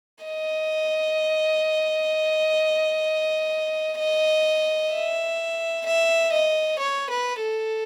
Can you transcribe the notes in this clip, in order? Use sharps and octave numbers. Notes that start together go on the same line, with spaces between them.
D#5
D#5
E5
E5
D#5
C#5
B4
A4